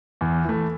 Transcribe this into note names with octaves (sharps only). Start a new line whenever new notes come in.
E2
E3 A3